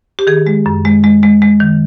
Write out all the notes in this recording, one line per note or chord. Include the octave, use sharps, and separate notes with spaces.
G4
D#3 G#4
G#3
F#2
G#3
G#3
G#3
G#3
D#3